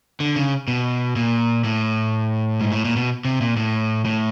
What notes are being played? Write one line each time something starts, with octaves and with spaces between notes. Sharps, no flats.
D3
C#3
B2
A#2
A2
G#2
A2
A#2
B2
C3
A#2
A2
A2